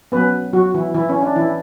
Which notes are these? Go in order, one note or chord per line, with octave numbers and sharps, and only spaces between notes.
F#3 B3 C#4 B4
F#3 F#4
E3 E4
E3 E4
C#4
D4
E3 E4